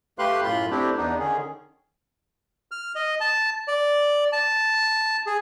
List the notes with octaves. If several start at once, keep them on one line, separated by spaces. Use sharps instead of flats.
A3 G4 B4 F5 C6 F#6
F#2 A2 F4 B5 C6
A3 C4 D4 E4 G4
E2 B3 D4 D#4
D3 D#3 C#4 G#4
F6
D#5
A5
D5
A5
G#4